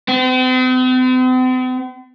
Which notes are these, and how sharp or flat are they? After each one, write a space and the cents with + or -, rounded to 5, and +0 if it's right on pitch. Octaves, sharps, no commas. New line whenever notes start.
C4 -45